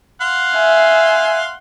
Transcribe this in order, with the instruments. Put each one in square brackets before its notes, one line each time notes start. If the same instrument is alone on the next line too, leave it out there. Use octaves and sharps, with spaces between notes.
[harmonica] F5 F#5 C6
[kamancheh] E5 G#5